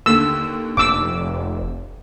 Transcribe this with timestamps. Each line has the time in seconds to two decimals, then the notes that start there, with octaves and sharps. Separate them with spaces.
0.06 D#2 D3 E6
0.77 F1 D6 E6